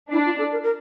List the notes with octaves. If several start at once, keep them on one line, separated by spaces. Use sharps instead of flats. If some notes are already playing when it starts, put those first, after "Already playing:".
D4 E4
F4
A4
A#4
A#4